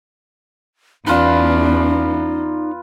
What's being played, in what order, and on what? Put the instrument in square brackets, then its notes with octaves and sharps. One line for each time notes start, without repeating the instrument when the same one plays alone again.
[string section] E2 [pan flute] C#4 [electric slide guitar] D#4 D5 [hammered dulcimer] F4 B4